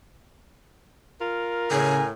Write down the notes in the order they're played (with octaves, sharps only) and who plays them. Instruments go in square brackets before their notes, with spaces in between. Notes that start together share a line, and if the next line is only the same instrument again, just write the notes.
[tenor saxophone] F4 [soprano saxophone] A#4
[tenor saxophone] A2 [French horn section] C#3 [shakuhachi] G#5